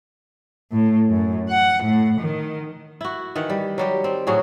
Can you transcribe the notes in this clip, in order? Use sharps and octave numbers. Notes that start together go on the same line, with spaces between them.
A2
F#2
F#5
A2
D#3
E4 F#4
D#3 E3 F#5
G3
F#3 G3 G4
C4
A2 F#3 F#4 G#4